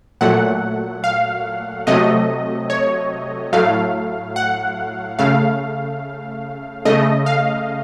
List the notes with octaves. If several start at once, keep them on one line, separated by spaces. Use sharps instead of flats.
A#2 F#3 A3 F#5
F5
C3 F#3 A3 D#5
C#5
A2 F#3 A3 F5
F#5
C#3 A3 F5
C#3 A3 D#5
F5